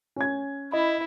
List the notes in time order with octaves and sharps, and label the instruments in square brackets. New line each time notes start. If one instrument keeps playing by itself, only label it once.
[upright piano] C#4 G#6
[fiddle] E4 [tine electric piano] D#5 B5